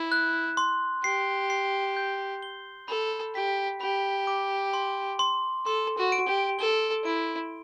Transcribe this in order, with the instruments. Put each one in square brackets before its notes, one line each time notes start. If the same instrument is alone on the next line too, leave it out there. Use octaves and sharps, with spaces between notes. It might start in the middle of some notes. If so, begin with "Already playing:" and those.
Already playing: [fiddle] E4
[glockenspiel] F#6
C6
[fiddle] G4 [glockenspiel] C7
[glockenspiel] C7
G6
G7
[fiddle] A4 [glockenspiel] B5
[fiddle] G4 [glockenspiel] B6
[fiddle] G4 [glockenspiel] B5
[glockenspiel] D6
C6
C6
[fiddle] A4 [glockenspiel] C6
[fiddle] F#4
[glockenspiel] D7
[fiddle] G4
[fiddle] A4 [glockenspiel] G7
[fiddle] E4 [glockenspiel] D7